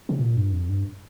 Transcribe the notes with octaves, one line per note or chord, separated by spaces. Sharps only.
C3
A#2
G2
F2
G2